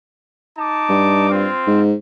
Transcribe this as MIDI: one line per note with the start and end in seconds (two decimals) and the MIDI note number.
0.58 1.29 63
0.58 1.29 81
0.58 1.29 86
0.89 1.47 43
1.30 1.81 60
1.30 1.81 65
1.67 1.94 44